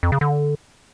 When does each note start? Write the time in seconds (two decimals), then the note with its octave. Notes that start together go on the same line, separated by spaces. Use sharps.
0.03 F2
0.12 C#3
0.21 D3